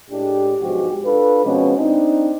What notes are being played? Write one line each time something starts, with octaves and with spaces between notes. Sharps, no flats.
A2 G#3 D4 G4
B1 G#2 F3 G#3 F#4 G4
D4 F4 A4 B4
B2 F3 G#3 C4 C#4
C4 D4 D#4